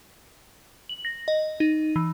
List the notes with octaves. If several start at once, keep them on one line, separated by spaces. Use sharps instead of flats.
F#7
A#6
D#5
D#4
E3